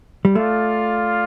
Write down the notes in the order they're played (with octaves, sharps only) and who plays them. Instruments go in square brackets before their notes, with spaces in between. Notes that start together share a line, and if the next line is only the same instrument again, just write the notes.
[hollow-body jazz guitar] G3
[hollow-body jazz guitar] A3 [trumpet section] F4 D5 F5